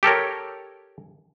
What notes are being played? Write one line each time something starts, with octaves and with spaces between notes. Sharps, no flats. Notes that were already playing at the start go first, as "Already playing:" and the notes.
G4 A4 A#4 C#5